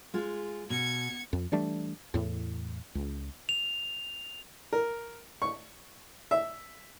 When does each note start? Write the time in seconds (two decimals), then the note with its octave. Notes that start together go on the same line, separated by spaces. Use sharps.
0.14 G#3 F4 G#4
0.70 B2 G#6 C#7
1.33 F2
1.52 E3 G3 A3 D4
2.14 E2 A2
2.95 C#2
3.49 F7
4.73 A#4
5.42 C#6
6.31 E5